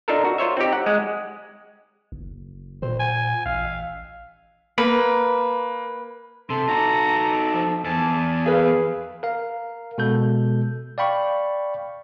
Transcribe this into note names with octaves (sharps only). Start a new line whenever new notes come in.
D4 D#4 F4 A4 A#4
F#4
F4 C5 C#5 E5
C4 D#4 G4
F#5
G#3 F#5
F#1
A#2 C5
G#5
A1 F5
A#3 B4
C3 A4 C6
D#4 F#4 A#5
F3
E2 G#5 A5
G#4 B4 F5
A#4 F5
B2 G#3 A4 G6
D5 F5 G5 B5 C#6